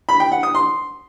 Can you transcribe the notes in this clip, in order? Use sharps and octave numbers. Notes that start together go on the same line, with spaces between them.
B5
G5
F#5
D#6
C6